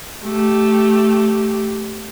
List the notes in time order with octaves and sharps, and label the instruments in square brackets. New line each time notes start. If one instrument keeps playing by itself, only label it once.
[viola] A3 G4